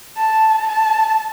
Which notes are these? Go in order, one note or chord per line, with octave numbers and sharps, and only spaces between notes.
A5
A5